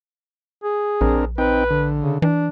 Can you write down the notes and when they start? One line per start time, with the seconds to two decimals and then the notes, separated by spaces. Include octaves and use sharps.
0.63 G#4
1.01 A#1 C4 D4 A#4
1.38 C4 D#4 B4 G5
1.70 D3
2.02 C#3
2.22 E3 D4